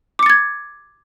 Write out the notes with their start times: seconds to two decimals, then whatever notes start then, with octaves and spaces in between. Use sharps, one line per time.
0.19 D6
0.23 C#7
0.26 A6
0.30 G#6